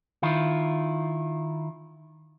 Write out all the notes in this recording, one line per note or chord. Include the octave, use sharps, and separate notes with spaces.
D#3 E4 F4